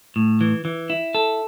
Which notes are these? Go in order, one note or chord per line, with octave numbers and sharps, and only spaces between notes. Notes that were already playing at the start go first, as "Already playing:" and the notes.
A2
E3
E3
E4
A4